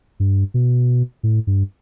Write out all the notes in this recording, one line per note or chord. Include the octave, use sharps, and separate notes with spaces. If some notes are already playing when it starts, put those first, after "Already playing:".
G2
B2
A2
G2